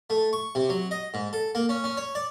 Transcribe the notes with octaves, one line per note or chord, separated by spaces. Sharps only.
A3
C#6
C3
F#3
D#5
G#2
A4
A#3
C#4
C#4
C#5
D5